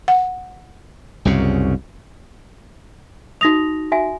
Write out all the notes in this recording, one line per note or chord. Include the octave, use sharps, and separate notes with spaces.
F#5
C2 F#2 C#3
D#4 F#4 D#6 A#6 F7
F#4 E5 G#5